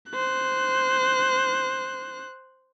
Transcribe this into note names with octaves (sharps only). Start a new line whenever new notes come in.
C5 F#6